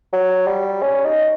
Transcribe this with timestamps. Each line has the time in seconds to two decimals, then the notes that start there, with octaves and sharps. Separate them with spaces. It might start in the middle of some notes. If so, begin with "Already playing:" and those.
0.13 F#3
0.47 G3
0.82 C#4
1.04 D#4